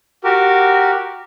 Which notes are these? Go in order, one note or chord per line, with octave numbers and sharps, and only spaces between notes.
F#4 G4 A#4